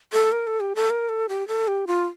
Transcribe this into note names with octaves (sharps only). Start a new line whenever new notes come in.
A4
A#4
A4
G4
A4
A#4
A4
G4
A4
G4
F4